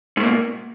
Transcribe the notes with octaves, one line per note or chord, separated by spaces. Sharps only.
G#2 B2 A3 A#3